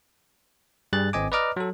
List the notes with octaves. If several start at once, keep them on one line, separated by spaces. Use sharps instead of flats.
G2 G3 G#4 F#6 A6
G#1 C4 D#5 G#5 D6
B4 D5 D#5 A#5 D6 F6
F#3 A4